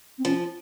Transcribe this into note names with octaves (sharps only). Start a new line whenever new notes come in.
C4
F3 C#4